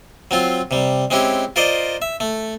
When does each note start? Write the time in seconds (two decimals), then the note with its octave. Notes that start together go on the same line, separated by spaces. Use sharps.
0.31 F#3 C4 F4
0.71 C3 G3
1.11 G#3 C4 C#4 E4 G4
1.56 F4 A#4 C5 D5 D#5
2.02 E5
2.20 A3